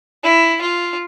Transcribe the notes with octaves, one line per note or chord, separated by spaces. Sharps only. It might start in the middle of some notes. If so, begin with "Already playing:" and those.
E4
F4